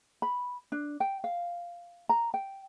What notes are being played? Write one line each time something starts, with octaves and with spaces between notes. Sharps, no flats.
B5
D4
G5
F5
A#5
G5